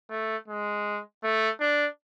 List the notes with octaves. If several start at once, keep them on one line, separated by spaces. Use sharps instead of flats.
A3
G#3
A3
D4